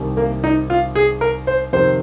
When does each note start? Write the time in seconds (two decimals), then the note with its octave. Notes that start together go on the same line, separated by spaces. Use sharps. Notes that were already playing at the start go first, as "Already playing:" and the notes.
Already playing: C2 C3 D#3
0.17 A#3
0.44 D#4
0.70 F4
0.95 G#4
1.21 A#4
1.47 C5
1.73 F2 C3 D#3 C5